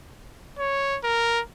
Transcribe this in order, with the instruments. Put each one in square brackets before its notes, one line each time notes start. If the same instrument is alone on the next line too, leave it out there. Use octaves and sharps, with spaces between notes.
[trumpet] C#5
A#4